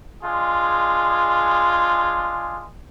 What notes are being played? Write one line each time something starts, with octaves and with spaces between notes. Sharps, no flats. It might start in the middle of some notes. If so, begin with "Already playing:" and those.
G#3 D4 F4 G#4